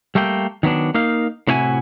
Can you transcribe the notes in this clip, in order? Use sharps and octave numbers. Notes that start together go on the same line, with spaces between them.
G3 A3 A#3 G5
D#3 F#3 B3 D4
A#3 D#4 F5
A2 C3 D4 E4 F#4 G#5